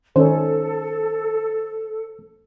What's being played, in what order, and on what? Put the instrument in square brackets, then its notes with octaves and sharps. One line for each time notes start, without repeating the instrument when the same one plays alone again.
[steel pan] D#3 C#4 D#4 [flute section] A4 [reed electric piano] C5